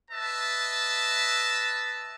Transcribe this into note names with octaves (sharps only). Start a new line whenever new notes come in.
B4 D#5 E5 A5